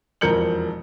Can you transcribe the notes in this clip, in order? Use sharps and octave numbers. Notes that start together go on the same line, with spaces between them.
E1 F2 A#4 G6 C#7 F#7